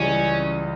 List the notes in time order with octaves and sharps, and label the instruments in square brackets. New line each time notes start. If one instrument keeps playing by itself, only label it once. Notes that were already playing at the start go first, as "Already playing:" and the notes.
Already playing: [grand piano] C#2 C#3 E3 G3 [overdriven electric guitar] C#4